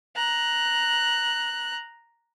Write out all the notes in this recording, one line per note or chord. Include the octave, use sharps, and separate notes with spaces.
A#5 F#6